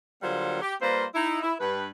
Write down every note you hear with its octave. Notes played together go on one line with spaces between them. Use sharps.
D3 F#3 G3 A#3 F4 C5
G4
G3 A#3 F4 B4 C5
D#4 E4
E4
G2 B4